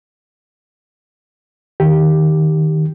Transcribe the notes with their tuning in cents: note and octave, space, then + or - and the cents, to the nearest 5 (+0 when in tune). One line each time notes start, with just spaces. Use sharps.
D#3 +0 G4 +0